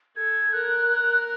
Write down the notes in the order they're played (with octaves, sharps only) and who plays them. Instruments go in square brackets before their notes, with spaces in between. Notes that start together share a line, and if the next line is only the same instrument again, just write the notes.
[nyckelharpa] A4 [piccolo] G#6
[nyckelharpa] A#4 [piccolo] F#6
[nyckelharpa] A#4